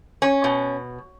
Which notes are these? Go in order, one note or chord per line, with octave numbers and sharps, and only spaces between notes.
C#4
B2